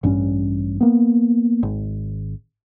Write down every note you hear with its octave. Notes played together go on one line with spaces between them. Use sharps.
A1 G2 G3 C#4
A#3 B3
G#1